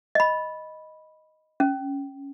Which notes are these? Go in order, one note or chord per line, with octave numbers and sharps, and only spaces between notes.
D#5 B5
C#4